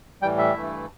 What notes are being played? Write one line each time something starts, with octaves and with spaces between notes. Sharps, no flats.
A2 E3 G3 G5
E5
G2 E3 A3 E4